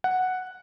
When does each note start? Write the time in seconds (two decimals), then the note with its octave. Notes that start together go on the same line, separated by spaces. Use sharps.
0.04 F#5